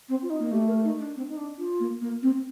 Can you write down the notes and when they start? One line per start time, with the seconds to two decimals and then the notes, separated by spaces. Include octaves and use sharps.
0.09 C4
0.22 F4
0.30 D#4
0.40 A#3
0.51 A3 G4
0.67 A#4
0.84 D#4
1.00 D4
1.16 C4
1.29 D#4
1.37 D4
1.58 F4
1.80 A#3
2.01 A#3
2.23 C4